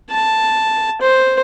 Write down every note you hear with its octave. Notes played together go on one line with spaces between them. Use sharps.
A5
C5